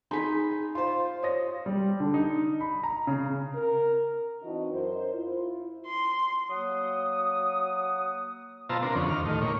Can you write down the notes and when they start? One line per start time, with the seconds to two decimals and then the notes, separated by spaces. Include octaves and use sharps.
0.11 D#4 G#4 G#5 B5 C6
0.75 F4 C5 C6
1.23 C#5 D#6 A#6
1.66 G3
2.00 D3
2.14 D#4
2.61 B5
2.83 A#5
3.07 C#3
3.55 A#4
4.42 E3 C4 D4 D#4 F#4 D#5
4.72 F#2 A#4 C5
5.13 E4 F4
5.86 C6
6.50 F#3 A#3 F#5 D#6
8.69 B2 F4 C5 A5 A#5 E6
8.82 C4 D4 A#4
8.95 F2 D3 C#4
9.09 D#2 F6
9.25 A2 D#3
9.41 A#2 C#5